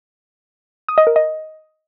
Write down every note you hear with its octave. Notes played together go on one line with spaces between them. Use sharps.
D#6
D#5
A#4
D#5